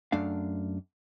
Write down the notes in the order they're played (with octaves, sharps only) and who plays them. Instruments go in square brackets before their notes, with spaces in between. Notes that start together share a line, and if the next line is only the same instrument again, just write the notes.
[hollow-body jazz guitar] F#2 A3 D4 F5